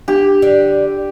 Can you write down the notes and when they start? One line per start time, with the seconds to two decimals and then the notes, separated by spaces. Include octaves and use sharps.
0.08 D4 G4
0.42 D3 D5